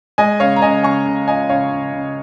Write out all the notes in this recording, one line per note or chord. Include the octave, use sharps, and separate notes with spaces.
G#3 D#5 G#5
C#3 C#5 F5
A#5
C#3 D#5 G#5
C#3 G#5 C#6
C#3
F4 D#5 G#5
C#3 C#5 F5
C#3
C#3